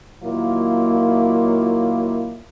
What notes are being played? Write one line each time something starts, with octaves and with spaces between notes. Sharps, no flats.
A#2 D#3 F#3 A#3 E4 F4